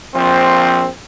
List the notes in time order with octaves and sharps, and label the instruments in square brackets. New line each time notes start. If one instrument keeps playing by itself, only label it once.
[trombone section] A#1 F3 C4